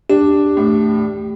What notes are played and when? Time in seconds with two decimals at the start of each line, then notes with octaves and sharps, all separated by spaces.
0.10 D4 G4
0.57 A2